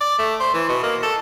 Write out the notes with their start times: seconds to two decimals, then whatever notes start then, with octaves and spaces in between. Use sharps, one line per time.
0.01 D5
0.19 A3
0.40 C5
0.54 E3
0.69 B2
0.83 A#3
1.03 A4